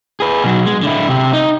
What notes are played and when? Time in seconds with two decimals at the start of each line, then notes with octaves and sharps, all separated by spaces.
0.20 G#4 B4
0.44 B2 F#3
0.66 G#3
0.82 D3 E4
1.09 C3 G4
1.33 D#4